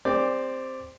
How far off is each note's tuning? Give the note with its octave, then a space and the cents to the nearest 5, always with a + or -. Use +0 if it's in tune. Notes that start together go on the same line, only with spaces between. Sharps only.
C4 +0 G4 +35 D5 +0